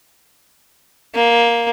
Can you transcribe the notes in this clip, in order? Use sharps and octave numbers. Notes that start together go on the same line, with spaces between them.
A#3